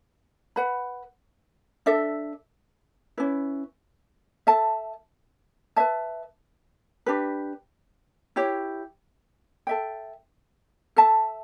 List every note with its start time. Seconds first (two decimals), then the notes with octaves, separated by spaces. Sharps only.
0.56 B4 F#5 B5
1.86 D4 A4 E5
3.17 C#4 E4 B4
4.47 A4 E5 A5
5.76 B4 E5 A5
7.06 D4 G4 B4
8.36 E4 G4 C#5
9.67 A4 E5 G5
10.96 A4 E5 A5